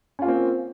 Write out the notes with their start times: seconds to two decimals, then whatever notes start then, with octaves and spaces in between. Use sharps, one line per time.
0.19 C#4
0.22 F4
0.25 A#3
0.28 C4